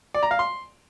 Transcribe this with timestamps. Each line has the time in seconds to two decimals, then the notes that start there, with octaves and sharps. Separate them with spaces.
0.14 D5
0.23 A#5
0.31 F5
0.39 C6